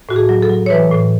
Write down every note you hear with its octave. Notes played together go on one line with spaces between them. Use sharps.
A2 F#4
G#4
F#3
A4
F#3
C#5
E3 B4
A2